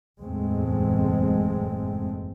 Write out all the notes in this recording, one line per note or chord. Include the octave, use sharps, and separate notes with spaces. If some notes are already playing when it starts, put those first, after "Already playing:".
F#1 E2 A2 G#3 A3 C4